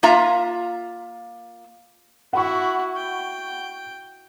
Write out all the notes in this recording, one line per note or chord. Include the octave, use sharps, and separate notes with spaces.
A#3 F4 E5 A#5
E4 F#4 F#5 B5 C#6
G5